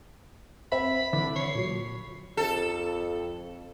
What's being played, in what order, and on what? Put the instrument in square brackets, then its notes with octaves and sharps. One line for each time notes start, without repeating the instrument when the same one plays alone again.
[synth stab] C4 [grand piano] E5 [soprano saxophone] B5
[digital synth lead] D3 [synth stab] E3
[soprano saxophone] C#5 [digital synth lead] C7
[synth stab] A#2 F#3
[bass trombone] F2 [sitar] A4